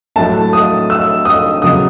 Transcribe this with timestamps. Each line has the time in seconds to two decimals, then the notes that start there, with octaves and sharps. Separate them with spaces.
0.16 A2 F#3 A3 A5
0.53 D#6
0.90 E6
1.25 D#6
1.62 C#3 F#3 B3 D#6